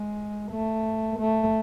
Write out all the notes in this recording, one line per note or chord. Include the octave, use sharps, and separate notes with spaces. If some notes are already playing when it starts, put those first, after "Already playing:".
Already playing: G#3
A3
A3